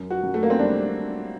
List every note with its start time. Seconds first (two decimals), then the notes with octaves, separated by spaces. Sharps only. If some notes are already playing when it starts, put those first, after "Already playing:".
Already playing: F#2
0.10 F#4
0.23 F#2
0.34 A3
0.43 A#3
0.50 C4
0.59 G3 D4